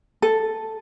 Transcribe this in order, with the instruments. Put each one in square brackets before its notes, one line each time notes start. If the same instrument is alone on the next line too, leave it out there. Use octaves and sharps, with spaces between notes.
[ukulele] A4